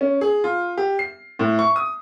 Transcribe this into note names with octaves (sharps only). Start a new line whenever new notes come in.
C#4
G#4
F4
G4
C7
A2
C#6
D#6